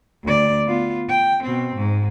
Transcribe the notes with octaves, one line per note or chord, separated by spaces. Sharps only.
D2 D5
B3 F4
G5
B2 C4
G#2